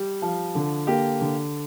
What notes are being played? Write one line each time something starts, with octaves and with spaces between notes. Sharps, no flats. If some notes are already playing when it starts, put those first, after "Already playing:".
Already playing: G3
F3
D3
A#3 G4
D3